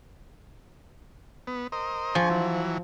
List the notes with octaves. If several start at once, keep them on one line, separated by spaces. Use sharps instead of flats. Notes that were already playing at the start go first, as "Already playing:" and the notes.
B3
A#4 C5 D#5
F3 G#4 G#5 C#6
E3 F#3